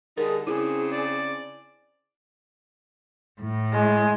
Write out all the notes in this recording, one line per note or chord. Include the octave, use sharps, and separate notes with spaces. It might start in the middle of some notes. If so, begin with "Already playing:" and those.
D3 G3 D#4 G#4 A#4
C#3 C4 D4 E4 G#4
D5
A2
G#3